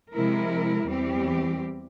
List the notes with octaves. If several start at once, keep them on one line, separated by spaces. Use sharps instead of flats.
C3 F3 G#3 E4 A#4
E2 E3 G3 C4 G4